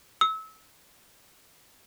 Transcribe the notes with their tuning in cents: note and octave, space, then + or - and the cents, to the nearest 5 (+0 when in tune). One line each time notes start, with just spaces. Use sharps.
E6 -30